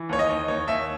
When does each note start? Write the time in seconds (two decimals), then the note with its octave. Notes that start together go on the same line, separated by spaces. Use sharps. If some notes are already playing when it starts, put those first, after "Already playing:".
Already playing: E3
0.09 D#2 C#5
0.19 D#5
0.29 D#2
0.48 D#2 C#5
0.67 D#2 E5